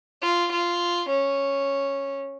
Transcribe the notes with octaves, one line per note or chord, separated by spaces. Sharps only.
F4
F4
C#4